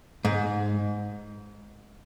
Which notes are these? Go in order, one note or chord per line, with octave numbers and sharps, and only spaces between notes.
G#2